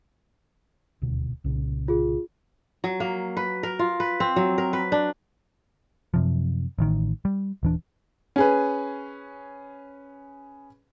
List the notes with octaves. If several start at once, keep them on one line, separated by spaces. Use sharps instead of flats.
D#1 D2 B2
C2 A#2 C#3
F4 G#4
F#3
A#3
B4
A#4
F4
B4
C4
F#3
A#4
B4
D4
F#2 C3 F3
A1 A2 D#3
G3
D#1 E3 D4
C#4 G#4 B4